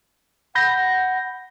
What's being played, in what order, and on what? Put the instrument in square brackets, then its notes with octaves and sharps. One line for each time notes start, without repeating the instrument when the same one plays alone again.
[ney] F#5 [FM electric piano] B5 G6 A#6